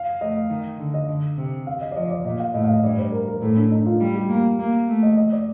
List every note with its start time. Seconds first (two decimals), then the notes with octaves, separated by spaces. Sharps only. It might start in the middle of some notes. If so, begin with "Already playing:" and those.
Already playing: F5
0.21 A3 D#5
0.50 D#3
0.79 D3
0.94 D#5
1.09 D3
1.37 C3
1.67 F5
1.81 D#5
1.91 D5
1.96 F3 D#5
2.11 D5
2.25 A#2 D#5
2.40 F5
2.54 A2 D#5
2.64 F5
2.73 D#5
2.84 G2 D5
2.98 C5
3.12 A#4
3.28 A#4
3.42 A2 A4
3.57 D4
3.71 D#4
3.86 F4
4.00 G3
4.15 G4
4.29 A#3
4.59 A#3
4.88 A3
5.03 D#5
5.17 D#5
5.32 D5